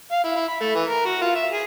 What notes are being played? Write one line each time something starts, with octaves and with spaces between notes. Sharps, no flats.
F5
E4
E4
B5
A3
E3
A#4
F#4
F4
E5
G#4